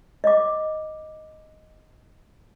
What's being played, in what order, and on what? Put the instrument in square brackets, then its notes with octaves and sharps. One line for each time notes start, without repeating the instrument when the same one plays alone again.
[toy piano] D#5 D6